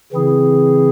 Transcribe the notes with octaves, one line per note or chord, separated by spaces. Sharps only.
C#3 E3 C4 E4 G#4